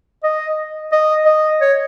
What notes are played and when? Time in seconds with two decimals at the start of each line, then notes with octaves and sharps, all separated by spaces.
0.23 D#5
0.92 D#5
1.26 D#5
1.61 C#5